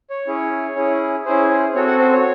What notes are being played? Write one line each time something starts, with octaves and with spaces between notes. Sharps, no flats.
C#5
C#4 E4 G#4
C#4 E4 G#4
C#4 E4 G#4 C5
C5
C4 F#4 A4 C#5
F#5
C5
C#5